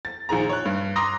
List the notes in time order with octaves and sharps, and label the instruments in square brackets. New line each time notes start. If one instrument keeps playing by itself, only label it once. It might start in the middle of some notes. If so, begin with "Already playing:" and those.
[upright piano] A6
A#1 D#3 G#4 A#5
C#5 F#6
G2
A#5 C6 D6 D#6 A#6